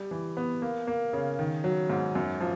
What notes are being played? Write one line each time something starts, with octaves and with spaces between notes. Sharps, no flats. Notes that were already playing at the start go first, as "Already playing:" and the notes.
Already playing: G3
E3
B3
A#3
A#3
C#3
D#3
F#3
G#2
F#2
F3